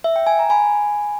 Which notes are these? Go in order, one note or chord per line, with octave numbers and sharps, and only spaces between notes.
E5
G5
G#5
A#5
G#5 B5